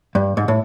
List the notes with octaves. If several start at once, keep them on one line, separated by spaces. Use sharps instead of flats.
G2
G#2
A2